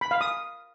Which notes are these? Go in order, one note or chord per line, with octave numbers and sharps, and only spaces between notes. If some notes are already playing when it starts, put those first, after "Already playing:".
B5
F5
D#6